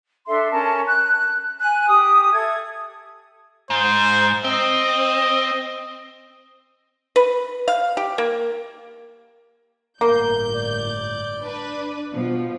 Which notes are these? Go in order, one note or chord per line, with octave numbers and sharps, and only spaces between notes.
D4 A4 E5 C6
C#4 A#4 A5
F#6
G#5 F#6
G4 D#6
A4 E5 G#6
G#2 C5
C4 D#5
B4
F5
G4
A#3
G1 A2 A#3 G6
D5
D4 B4
B2 F3